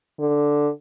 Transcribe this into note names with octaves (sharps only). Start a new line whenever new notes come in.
D3